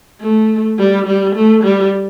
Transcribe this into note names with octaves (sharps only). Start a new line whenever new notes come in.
A3
G3
G3
A3
G3